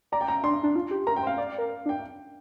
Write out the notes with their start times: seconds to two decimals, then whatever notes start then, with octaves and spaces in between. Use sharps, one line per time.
0.12 D5 A#5
0.21 G5
0.28 A#5
0.43 D4 C6
0.63 D4
0.76 F4
0.91 G4
1.07 A#4 A#5
1.16 G5
1.23 C5
1.27 F5
1.38 D5
1.48 D5
1.58 A#4
1.86 D4
1.89 G5